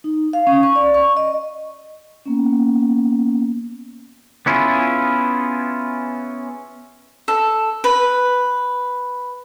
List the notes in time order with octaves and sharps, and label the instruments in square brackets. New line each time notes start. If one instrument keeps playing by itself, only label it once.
[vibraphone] D#4
F5
C#4
C#6
D5
C#6
D#5
A#3 B3 C#4
[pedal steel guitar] B3 C#4 E4 F4 G#4
[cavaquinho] A4
B4